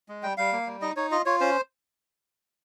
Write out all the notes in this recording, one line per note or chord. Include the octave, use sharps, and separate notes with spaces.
G#3
G3 G5
G3 F5
A#3
G3
D#4 D#5
D#4 C#5
F4 D#5
F4 C#5
C#4 C5